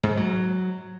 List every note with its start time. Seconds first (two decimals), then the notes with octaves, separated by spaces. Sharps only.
0.03 G#2
0.17 F#3